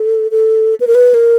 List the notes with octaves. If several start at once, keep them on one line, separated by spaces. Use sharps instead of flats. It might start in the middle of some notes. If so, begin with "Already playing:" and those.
Already playing: A4
A4
B4
A#4
B4
A#4